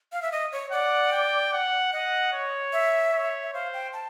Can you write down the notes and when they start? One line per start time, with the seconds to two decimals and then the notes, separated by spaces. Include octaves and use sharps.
0.12 F5
0.22 E5
0.32 D#5
0.52 C#5
0.72 D5 F#5
1.12 G5
1.53 F#5
1.92 D#5 F#5
2.32 C#5
2.73 E5
3.13 C#5
3.43 E5
3.54 C5 F5
3.74 G5
3.93 A5